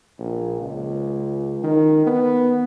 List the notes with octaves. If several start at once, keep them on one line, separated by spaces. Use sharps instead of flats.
A#1
C#2
D#3
B3